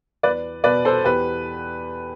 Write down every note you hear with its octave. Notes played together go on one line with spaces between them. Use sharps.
E2 B4 D5
B2 B4 D5
A4 C5
E2 G4 B4